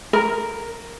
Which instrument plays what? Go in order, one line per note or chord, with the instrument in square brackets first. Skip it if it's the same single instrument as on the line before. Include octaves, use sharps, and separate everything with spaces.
[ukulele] A#4